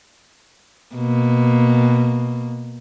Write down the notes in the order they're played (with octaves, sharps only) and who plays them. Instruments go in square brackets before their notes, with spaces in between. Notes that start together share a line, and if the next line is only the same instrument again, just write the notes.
[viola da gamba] B2 A#3